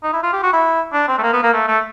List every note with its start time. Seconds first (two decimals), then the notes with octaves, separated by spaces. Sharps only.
0.03 D#4
0.13 E4
0.23 F4
0.33 G4
0.43 F#4
0.53 E4
0.93 D4
1.08 C4
1.18 A3
1.23 A#3
1.33 B3
1.43 A#3
1.53 A3
1.68 A3